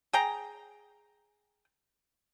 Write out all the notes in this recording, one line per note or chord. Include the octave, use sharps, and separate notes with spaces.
G#4 G5 A#5